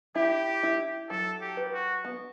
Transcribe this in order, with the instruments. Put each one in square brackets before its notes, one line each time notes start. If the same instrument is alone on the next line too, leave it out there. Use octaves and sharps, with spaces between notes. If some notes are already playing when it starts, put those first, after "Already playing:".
[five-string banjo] E4 [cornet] G4
[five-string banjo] E4
[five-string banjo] F#3 [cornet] A4
[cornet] G4
[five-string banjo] B4
[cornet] F#4
[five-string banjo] B3